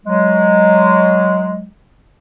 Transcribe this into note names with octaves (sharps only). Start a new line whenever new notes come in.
F#3 G#3